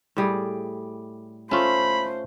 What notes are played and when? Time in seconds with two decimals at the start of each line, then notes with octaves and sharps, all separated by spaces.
0.17 A2 G3 G#4
1.51 A3 C#4 F4 C5 B5